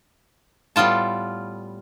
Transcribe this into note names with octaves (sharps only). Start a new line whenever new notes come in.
A2 G3 B3 F4 A5